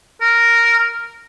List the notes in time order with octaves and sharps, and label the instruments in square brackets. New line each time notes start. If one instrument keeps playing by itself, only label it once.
[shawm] A#4